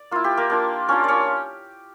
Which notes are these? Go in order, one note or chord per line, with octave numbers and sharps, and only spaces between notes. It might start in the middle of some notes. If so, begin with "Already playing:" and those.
Already playing: D5
A#3 E4 F4
G4
A#3 A#4
A#3 D4 F4
A#3 C#4 D4 F4 C#5
C#4 C#5 D5